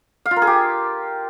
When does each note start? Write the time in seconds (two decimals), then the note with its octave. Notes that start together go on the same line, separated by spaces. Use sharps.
0.26 F5
0.31 F4
0.36 A#4
0.42 G#4
0.47 G4